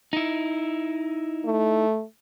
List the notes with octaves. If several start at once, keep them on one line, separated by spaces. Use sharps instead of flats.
D#4 E4
A3